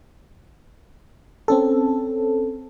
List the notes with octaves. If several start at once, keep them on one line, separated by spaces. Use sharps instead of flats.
C4 C#4 A4